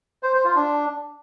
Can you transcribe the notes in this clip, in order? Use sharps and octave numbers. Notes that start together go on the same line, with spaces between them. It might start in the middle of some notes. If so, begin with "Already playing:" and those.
C5
C5
F4
D4